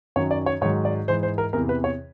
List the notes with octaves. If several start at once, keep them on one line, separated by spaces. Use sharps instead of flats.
F#2 D#3 F#3 C#5
D5
C#5
G#2 D#3 F#3 C#5
D5
G#2 E3 C5
C5
A#4
E2 C3 E3 A#4
B4
C#5